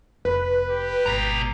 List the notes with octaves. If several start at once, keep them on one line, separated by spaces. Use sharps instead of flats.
F1 B4
G4
G#1 B2 A#5